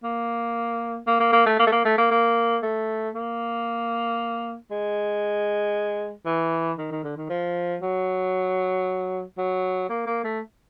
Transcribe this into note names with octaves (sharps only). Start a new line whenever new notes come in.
A#3
A#3
A#3
A#3
A3
A#3
A3
A#3
A3
A#3
A#3
A3
A#3
G#3
E3
D#3
D#3
D3
D#3
F3
F#3
F#3
A#3
A#3
A3